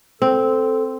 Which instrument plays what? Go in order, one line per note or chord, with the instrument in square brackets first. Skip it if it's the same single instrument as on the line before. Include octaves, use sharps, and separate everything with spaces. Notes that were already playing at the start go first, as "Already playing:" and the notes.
[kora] C4 [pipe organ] A4